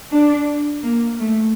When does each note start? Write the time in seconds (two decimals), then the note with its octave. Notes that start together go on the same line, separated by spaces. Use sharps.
0.12 D4
0.83 A#3
1.19 A3